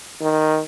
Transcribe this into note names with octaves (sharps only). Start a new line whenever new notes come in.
D#3